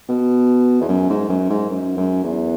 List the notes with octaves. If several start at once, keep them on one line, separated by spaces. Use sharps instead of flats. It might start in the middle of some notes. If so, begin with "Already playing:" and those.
B2
E2
F#2
G#2
F#2
G#2
F#2
F#2
E2